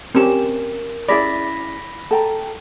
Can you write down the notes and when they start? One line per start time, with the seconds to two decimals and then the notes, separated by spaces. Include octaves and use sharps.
0.15 C4 C#4 G4 A#4 E7
1.09 C#4 E4 G#4 D5 B5 A#6 B6
2.11 A4 G5 A#5